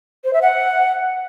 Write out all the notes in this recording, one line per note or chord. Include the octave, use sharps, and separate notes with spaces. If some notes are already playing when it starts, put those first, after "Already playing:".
C5
E5
F#5